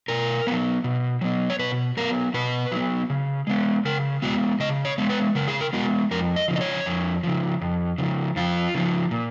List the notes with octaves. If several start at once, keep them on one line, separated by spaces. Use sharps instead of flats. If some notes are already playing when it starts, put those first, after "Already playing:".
B2 A#4
F#3 B3
B2
F#3 B3
C#5
B2 B4
F#3 B3 A#4
B2 B4
F#3 B3
C#3
G#3 B3
C#3 A#4
G#3 B3 F#4
C#3 D#5
C#5
G#3 B3
B4
C#3 A#4
G#4
A#4
G#3 B3 F#4
F2 A#4
D#5
C#3 F3
D#5
C#5
F2
C#3 F3
F2
C#3 F3
F2 F4
C#3 F3
A#2